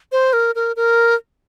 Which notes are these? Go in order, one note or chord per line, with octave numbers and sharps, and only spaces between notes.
C5
A#4
A#4
A#4